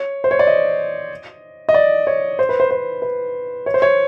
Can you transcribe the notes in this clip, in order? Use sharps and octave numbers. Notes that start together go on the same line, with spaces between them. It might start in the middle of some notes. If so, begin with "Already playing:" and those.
Already playing: C#5
C5
C#5
D5
D#5
D#5
D5
C#5
C5
B4
C5
C5
B4
C#5
C5
C#5